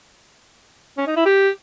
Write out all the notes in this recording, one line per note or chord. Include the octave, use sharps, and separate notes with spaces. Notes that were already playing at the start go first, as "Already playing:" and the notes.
C#4
D#4
E4
G4